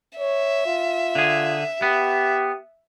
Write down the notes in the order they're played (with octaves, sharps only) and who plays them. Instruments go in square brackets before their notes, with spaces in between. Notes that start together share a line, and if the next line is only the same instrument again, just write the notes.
[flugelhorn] C#5 [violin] E5
[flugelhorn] F4
[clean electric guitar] D3 G#4
[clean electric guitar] B3 [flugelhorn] G4